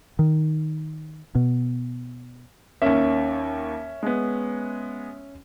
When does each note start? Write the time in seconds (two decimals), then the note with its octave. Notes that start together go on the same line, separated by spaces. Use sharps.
0.19 D#3
1.35 B2
2.82 D#2 A#3 C#4 E5
4.03 G#3 B3